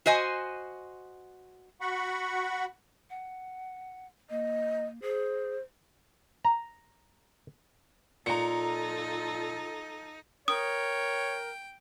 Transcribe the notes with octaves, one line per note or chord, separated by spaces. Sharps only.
F#4 C5 D#5 G#5
F#4 F#5 B5 C#6
F#5
A#3 D#5
G#4 C5
A#5
A#2 D#4 F4 A4 A#5 C#7
A#4 C#5 G5 D#6